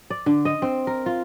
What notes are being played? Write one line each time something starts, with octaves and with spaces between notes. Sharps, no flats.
D5
D3
D#5
C4
A#4
F4